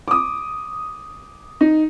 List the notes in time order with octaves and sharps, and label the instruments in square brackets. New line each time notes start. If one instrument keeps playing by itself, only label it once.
[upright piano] D6 D#6
D#4